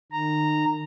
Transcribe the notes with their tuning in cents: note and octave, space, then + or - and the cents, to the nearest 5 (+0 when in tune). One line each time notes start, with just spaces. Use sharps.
D#3 -35 A#5 -10